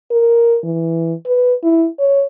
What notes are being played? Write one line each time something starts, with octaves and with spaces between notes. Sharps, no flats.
A#4
E3
B4
E4
C#5